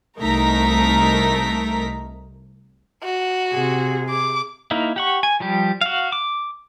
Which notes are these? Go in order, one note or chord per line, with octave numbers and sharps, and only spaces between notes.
C2 A3 D#4 A#4 A#5 B6
F#4
C3 G#4
D6
A#3 D#4 E4
G4 F#5 C#6
G#5
F3 G3 G4
F#4 F5
D6